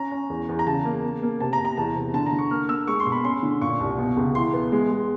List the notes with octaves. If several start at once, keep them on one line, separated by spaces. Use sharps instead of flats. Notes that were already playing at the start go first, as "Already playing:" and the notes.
Already playing: C#4 A#5
C#4
E2
E2
A#5
C#3 A5
A#3
A#3
A#3
C3 A5
A#5
C3
A#5
E2 A5
C3
D3 A5
A#5
D3
C#6
A#3 F6
A#3 E6
G#3 C#6
C6
B2
B5
C#4 C6
D3
A#2 C#6
C2
B2
C#2
E3 C6
B3
G#3
G#3